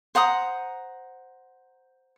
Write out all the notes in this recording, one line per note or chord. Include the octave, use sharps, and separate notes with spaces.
C5 F#5 A#5 D#6